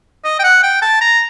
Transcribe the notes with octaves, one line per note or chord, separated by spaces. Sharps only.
D#5
G5
F#5
G5
A5
A#5